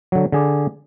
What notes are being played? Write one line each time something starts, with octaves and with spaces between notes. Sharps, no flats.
D3 F#3
D3 G#4 D5